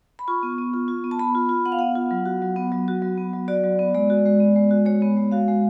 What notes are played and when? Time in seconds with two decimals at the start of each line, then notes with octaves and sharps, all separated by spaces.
0.19 B5
0.28 F4 C#6
0.43 B3
0.58 B3
0.74 F4
0.88 F4
1.04 B3
1.11 A5
1.19 B3 B5
1.35 F4
1.49 F4
1.66 B3 F#5
1.72 F5
1.79 B3 F#5
1.95 F4
2.11 F#3
2.26 F#4
2.42 F#3
2.56 B3
2.72 F#3
2.88 F#4
3.02 F#3
3.18 B3
3.33 F#3
3.48 F#4 D5
3.64 F#3
3.79 B3
3.94 G#3 D5
4.10 F#4
4.25 G#3
4.40 B3
4.56 G#3
4.71 F#4
4.86 G#3 C#5
5.02 B3
5.17 G#3
5.32 F#4 F5
5.48 G#3